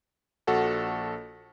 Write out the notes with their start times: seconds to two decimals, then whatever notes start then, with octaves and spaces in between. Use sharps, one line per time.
0.47 A#1 F#4 A4 F#5 A5